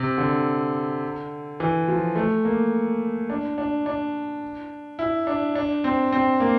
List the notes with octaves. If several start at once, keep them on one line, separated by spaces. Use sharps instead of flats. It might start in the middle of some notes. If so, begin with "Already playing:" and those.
Already playing: C3
D3
E3
F3
A3
A#3
D4
D4
D4
E4
D4
D4
C4
C4
A#3